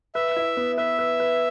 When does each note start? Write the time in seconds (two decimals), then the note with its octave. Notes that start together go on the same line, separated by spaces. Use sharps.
0.15 B4 E5
0.36 E4
0.57 B3
0.78 B4 E5
0.99 B4
1.20 B4